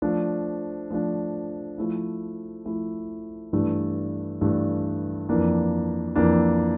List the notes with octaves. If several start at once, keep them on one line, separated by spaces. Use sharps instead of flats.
F3 A3 D4
F3 A3 D4
F3 A3 E4
F3 A3 E4
G2 E3 A3 D4
G2 E3 A3 D4
F2 E3 A#3 D4
F2 E3 A#3 D4